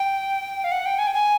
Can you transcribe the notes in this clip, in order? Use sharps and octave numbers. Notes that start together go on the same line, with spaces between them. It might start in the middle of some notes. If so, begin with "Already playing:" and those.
Already playing: G5
F5
F#5
G5
G#5
G5
G#5